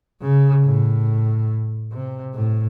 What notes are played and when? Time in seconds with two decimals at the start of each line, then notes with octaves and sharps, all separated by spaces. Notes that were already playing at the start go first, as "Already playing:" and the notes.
0.21 C#3
0.64 A2
1.92 C3
2.34 A2